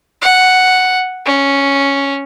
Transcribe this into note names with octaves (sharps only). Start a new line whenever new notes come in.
F#5
C#4